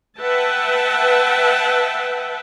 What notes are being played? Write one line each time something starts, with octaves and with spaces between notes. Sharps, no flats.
B4 E5 F#5 G5 A5